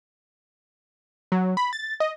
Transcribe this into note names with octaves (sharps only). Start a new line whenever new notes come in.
F#3
B5
A6
D#5